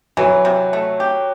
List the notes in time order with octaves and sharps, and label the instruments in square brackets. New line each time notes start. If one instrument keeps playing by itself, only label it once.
[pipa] E3 [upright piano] F#3
[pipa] C3
A3
G4